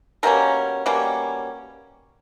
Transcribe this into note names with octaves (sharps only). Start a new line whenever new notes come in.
B2 G3 A#3 C#4 A#4
B2 G3 A#3 C#4